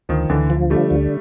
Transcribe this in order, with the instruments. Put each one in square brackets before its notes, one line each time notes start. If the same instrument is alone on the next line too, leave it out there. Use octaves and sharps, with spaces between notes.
[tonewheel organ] D2 [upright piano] D#3 F3
[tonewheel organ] D2 [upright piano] D3 E3
[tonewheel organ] F3
[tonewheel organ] D3 [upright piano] G3 A3
[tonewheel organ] D2